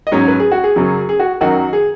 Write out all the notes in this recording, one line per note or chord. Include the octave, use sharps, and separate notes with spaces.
D#5
G#2 F#3 C#4 C#5
B4
G#4
F#4
G#4
F#2 C#3 F#3 C#4
G#4
F#4
F#2 D#3 F#3 D#4 F#4
G#4